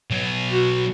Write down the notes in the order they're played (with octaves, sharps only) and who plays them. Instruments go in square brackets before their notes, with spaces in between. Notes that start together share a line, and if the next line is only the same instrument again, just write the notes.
[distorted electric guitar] B2 F#3
[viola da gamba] F#4